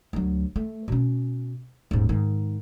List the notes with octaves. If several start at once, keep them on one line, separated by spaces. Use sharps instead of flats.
D2 F#3
A3
B2 C#4
D#1 G#2
G#2 D#3